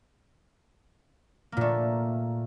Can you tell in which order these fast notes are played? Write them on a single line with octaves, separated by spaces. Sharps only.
A#3 A#2 A3